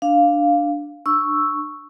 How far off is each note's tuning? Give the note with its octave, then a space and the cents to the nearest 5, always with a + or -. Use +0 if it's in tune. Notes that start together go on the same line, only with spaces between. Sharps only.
D4 +0 F5 +0
D4 +20 C#6 +0 E6 +0